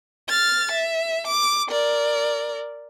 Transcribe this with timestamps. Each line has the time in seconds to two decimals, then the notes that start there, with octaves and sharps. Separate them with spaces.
0.28 F6 A6
0.72 E5
1.27 D6
1.68 A#4 D5